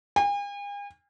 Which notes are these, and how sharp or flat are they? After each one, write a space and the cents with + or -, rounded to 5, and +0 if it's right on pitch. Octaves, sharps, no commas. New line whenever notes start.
G#5 -45